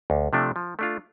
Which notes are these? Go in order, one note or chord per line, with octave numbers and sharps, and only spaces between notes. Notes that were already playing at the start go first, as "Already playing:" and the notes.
D2
C3 F3 A3 D4
F3
A3 D4 F4